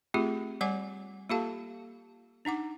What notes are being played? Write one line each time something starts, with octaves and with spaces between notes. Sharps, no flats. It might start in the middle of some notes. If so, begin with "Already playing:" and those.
A3 C4 F4 G4 G#4
G3 C#5 F#5 G#5 D6
A#3 F4 G4 A4 F5 A5
D4 D#4 F#5 D6